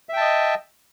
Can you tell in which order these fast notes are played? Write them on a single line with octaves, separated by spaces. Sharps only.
E5 G5 A5 D#5